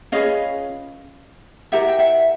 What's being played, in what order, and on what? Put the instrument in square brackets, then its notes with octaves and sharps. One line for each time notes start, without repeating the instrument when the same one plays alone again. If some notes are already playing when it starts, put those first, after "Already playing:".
[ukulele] C#4 F4 G#4 B4 D#5 F5
E4 G4 A#4 E5 F#5
G5
E5 F#5